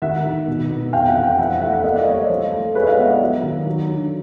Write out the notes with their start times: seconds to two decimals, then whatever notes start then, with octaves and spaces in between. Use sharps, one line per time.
0.02 D#3 E5 F#5
0.25 D#3
0.48 B2
0.70 B3
0.93 F2 F5 G5
1.08 E5 F#5
1.16 E3
1.23 F5 G5
1.38 F3 E5 F#5
1.62 A3 E5 F#5
1.72 E5 F#5
1.84 A#3 D#5 F5
1.96 D5 E5
2.07 G3 C#5 D#5
2.18 C5 D5
2.30 F3
2.52 A3
2.75 G#3 B4 C#5
2.82 E5
2.86 D#5 F5
2.98 B3 E5 F#5
3.09 D5 E5
3.21 F#3
3.43 D#3
3.67 F#3
3.89 D3